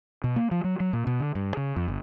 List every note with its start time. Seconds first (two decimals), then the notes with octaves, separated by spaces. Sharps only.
0.24 B2
0.36 A#3
0.51 F3
0.64 F#3
0.80 F#3
0.93 A#2
1.07 B2
1.20 D3
1.35 G2
1.57 C#3
1.76 F2
1.88 G1